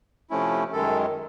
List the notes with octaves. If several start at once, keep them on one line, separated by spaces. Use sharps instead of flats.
C3 F3 A3 C#4 E4
F#2 D#3 G#3 A4